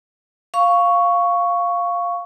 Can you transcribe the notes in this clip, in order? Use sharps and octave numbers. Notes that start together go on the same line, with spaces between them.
F5 C#6